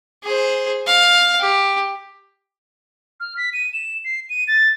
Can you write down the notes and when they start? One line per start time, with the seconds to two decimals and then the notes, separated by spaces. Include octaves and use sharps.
0.23 G#4 C5
0.87 F5
1.40 G4
3.20 F6
3.37 B6
3.53 D#7
3.73 E7
4.05 C7
4.30 D#7
4.48 A6